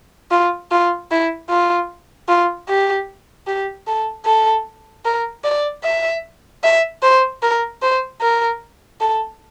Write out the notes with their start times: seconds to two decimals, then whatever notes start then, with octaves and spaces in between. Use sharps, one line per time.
0.31 F4
0.71 F4
1.11 E4
1.49 F4
2.28 F4
2.68 G4
3.47 G4
3.87 A4
4.26 A4
5.05 A#4
5.44 D5
5.84 E5
6.64 E5
7.03 C5
7.43 A#4
7.82 C5
8.21 A#4
9.01 A4